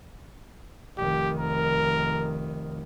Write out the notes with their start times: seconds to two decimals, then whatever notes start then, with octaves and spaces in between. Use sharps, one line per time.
0.98 F1 D#3 G4
1.38 A#4